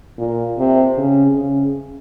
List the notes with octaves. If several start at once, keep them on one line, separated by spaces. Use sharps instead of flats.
A#2
C3
C#3
C#3